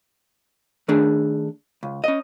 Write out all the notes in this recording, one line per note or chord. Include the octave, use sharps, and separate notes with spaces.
D#3 A3 D4 G#4
C#2
C#4 D#5